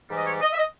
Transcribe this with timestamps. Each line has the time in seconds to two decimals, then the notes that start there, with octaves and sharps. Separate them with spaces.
0.09 G#2 E3 G3
0.16 D#5
0.25 C#5
0.41 D#5
0.53 E5
0.58 D#5